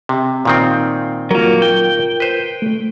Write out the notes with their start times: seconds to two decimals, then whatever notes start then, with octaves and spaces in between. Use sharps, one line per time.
0.09 C3
0.45 A#2 D#3 C4
1.31 F#3 A#3 F4 A#4
1.62 G5
2.20 B4 C5
2.62 A3